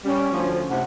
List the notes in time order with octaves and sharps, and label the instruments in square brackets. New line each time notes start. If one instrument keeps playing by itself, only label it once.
[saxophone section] G3 [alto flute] C#4
[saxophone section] D2 F3
[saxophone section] A2 C3 [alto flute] F#5